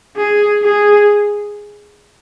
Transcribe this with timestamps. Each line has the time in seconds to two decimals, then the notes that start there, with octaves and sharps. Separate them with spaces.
0.17 G#4
0.63 G#4